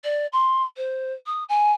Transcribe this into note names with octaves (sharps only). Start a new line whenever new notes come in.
D5
C6
C5
D#6
G#5